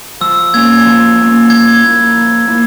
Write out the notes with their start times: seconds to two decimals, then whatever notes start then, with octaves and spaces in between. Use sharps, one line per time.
0.21 F3 E6
0.54 A#3 C#4 G#6
0.86 F3
1.18 A#3 C#4
1.50 F3 G#6
1.82 A#3 E4
2.16 F3
2.47 A#3 E4